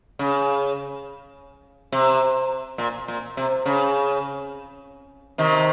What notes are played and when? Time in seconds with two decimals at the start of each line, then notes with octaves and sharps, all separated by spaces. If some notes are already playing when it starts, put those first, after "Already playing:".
0.19 C#3
1.92 C3
2.78 A#2
3.08 A#2
3.37 C3
3.66 C#3
5.38 C3 D#3